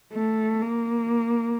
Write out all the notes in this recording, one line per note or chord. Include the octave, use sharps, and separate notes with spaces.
A3
A#3